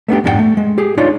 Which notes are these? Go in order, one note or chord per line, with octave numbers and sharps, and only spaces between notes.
A3 B3 D4 G4
F2 G#2 D4 F#4 F#5 G5
A3
G#3
G4 G#4
D4 D#4 F4 C#5 D5